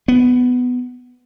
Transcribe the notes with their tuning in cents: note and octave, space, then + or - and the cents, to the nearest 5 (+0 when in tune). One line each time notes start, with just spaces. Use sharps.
B3 +10